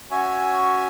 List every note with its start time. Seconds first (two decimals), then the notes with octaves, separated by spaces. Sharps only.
0.11 C#4 F#4 C#5 E5 G#5